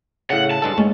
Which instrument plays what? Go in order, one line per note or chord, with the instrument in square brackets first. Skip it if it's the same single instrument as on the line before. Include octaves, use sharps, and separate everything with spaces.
[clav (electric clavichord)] A2 C#3 [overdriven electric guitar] F#5
[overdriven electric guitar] A5
[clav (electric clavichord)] G2 G#3 A4
[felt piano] G#3 [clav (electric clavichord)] C#4